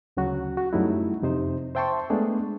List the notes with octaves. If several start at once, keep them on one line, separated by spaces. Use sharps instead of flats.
D2 C#3 F#3 F#4
F#4
F#2 F#3 G3 A3 D#4 E4
F2 C3 D#4 C5
C5 E5 G5 A5 C6 C#6
G#3 A3 B3 D4 G#4